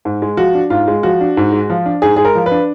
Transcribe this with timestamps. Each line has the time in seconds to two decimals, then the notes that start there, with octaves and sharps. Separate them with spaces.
0.05 G#2
0.22 G#3
0.37 F3 F#4
0.55 D4
0.70 G#2 F4
0.88 G#3
1.03 F3 F#4
1.21 D4
1.37 G#2
1.52 G#3
1.70 F3
1.86 D4
2.02 G#2 G#4
2.16 G#3 G#4
2.25 A#4
2.35 F3
2.46 B4
2.51 D4